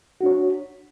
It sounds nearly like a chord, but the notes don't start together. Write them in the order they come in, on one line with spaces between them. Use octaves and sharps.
F#4 D4 C#5